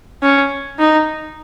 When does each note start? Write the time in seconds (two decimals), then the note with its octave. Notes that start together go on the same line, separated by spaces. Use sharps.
0.23 C#4
0.79 D#4